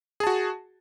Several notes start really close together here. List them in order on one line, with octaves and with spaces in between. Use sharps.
G#4 A5 F#4